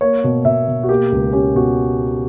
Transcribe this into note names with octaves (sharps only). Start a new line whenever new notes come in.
A#3 C#5
B2
B2 E5
B2
F#4
A#3 G4
C#2
C#4 G4
B2 F#4